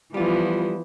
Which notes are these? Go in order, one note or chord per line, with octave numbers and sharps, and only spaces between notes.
E3 F3 G3 B3 F4